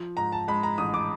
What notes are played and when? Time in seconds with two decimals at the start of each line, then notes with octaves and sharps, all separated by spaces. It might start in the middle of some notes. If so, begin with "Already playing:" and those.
Already playing: F3
0.17 G#2 A#5
0.32 A5
0.48 G#3 B5
0.63 A#5
0.78 A1 D#6
0.94 D6